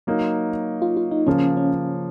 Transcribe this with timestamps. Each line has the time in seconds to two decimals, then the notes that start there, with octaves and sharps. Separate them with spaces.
0.07 F#3 A#3 D#4
0.82 F4
0.97 F4
1.11 D#4
1.27 C#3 F3 A#3 C#4
1.57 C#4